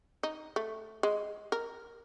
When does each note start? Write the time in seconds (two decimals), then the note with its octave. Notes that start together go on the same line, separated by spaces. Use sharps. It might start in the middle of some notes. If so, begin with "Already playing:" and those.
0.23 D#4
0.56 A3
1.03 G#3
1.52 A#4